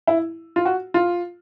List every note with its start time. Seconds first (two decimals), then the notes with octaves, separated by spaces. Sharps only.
0.08 E4
0.56 F4
0.65 F#4
0.94 F4